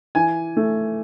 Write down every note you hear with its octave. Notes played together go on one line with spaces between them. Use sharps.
E3 G#5
A3